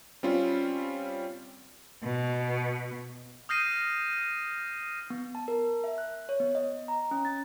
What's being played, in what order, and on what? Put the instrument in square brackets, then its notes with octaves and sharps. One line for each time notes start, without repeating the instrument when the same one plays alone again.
[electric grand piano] G3 C4 C#4 F4
[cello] B2
[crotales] D#6 F6 G6 A#6 C7 D#7
[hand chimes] B3
A5
A#4
E5
F#6
C#5
B3
D#5
A#5
C#4
A6